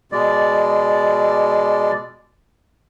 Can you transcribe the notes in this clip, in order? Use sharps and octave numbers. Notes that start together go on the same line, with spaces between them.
B2 G#3 D5